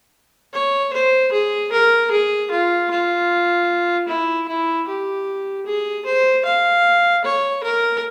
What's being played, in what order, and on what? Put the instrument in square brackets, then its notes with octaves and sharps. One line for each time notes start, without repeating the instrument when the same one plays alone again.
[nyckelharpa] C#5
C5
G#4
A#4
G#4
F4
F4
E4
E4
G4
G#4
C5
F5
C#5
A#4